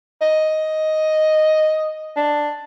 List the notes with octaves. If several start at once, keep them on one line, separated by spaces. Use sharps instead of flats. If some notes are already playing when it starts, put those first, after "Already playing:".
D#5
D4